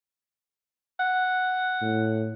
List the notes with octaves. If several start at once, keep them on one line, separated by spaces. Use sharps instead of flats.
F#5
A2